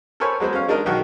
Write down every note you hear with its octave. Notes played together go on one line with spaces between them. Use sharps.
A4 A#4 C5 C#5 G#5 B5
F#3 G#3 B3 C5
C#4 F5
G#3 D4 D#4 A#4 D#5
B1 D#3 F#4